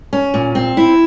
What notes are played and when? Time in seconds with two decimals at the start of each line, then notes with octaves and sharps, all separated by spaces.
0.13 C#4
0.34 A#2
0.55 C4
0.77 E4